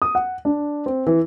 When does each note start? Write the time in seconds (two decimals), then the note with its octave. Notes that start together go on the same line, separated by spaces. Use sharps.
0.02 D#6
0.15 F#5
0.45 D4
0.86 C4
1.07 E3